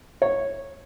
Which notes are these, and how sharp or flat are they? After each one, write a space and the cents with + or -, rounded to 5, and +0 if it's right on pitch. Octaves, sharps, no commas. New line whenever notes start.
C#5 -10